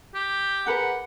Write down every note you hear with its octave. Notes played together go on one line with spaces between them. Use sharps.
G4
G#4 A#4 B4 F#5